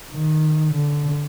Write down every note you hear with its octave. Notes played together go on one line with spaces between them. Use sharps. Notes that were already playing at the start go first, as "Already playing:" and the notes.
D#3
D3